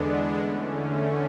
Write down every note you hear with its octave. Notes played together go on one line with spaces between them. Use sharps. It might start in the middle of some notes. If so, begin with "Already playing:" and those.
Already playing: E2 D3 G#3 B3 D4
E2 D3 A3 C#4